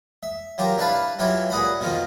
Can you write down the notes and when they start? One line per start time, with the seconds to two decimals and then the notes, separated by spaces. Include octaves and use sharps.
0.23 E5
0.58 F#3 F4 G4 A#4
0.78 D4 E4 B4 F5 A5 B5
1.19 E3 F#3 E4 F4 G4 C#5
1.50 A#2 G#4 F#5 B5
1.80 B2 D#3 F3 F4